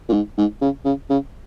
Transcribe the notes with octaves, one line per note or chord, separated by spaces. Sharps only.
A#2
G#2
G#2
C#3
C#3
C#3